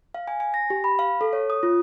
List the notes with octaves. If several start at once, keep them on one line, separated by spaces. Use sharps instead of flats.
F5
G#5
G#5
A#6
G4
B5
F5
A4
C#5
D#6
F4